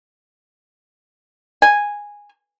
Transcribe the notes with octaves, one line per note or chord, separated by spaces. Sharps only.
G#5